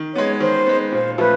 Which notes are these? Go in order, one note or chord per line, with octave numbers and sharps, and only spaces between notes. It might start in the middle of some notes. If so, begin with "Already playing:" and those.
Already playing: D#3
G#3 B3 C#5
D#3 C5
G#3 B3
A#2 C5
F3 A3 C#4 F4 B4